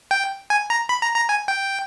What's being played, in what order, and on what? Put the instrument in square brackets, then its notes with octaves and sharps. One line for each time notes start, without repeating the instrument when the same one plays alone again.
[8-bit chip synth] G5
G#5
A#5
B5
A#5
A#5
G#5
G5